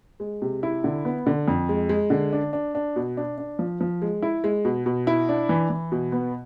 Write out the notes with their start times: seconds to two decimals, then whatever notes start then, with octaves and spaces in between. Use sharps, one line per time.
0.20 G#3
0.42 C3
0.63 E4
0.84 D3
1.05 B3
1.26 D3
1.48 F2
1.69 G#3
1.89 G#3
2.10 D3
2.33 D4
2.53 D4
2.75 D4
2.96 B2
3.17 D4
3.38 D4
3.59 F3
3.81 F3
4.02 G#3
4.22 E4
4.44 G#3
4.65 B2
4.86 B2
5.07 E4
5.29 D4
5.49 E3
5.70 E3
5.92 B2
6.12 B3